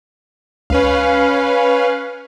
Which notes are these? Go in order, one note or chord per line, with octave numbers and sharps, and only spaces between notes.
C#2 C#4 B4 F5